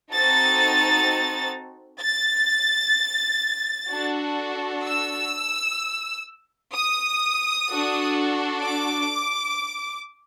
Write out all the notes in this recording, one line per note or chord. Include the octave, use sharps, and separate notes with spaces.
C4 D#4 F#4 A4 A6
A6
D4 F#4 A4
E6
D#6
D4 F#4 A4
D6